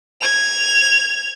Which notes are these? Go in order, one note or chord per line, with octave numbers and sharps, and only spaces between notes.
G#6 F7